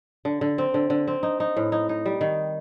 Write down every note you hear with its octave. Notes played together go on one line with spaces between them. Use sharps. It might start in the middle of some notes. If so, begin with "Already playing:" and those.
D3
D3
C4
D3
D3
C4
D#4
D#4
A2
D#4
D#4
G3
D#3